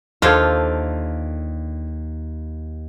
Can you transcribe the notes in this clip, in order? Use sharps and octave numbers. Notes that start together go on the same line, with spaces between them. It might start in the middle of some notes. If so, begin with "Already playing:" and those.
D#2 D3 F4 A4 C5 F5 G#6